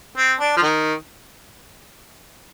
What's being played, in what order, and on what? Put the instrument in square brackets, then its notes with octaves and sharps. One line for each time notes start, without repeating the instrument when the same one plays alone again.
[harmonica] C4
D4
F3
D#3